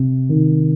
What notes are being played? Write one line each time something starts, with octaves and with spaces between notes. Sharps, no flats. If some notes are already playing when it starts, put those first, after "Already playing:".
Already playing: C3
D#3